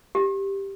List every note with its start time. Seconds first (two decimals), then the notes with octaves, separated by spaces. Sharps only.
0.15 G4